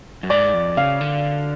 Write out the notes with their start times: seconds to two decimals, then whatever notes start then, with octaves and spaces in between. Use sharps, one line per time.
0.23 F#2
0.30 G#2 D5
0.54 F2
0.77 C#3 F5
1.01 D3